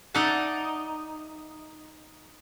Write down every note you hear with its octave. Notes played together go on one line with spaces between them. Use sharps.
D#4 D5 E5 F#5 A5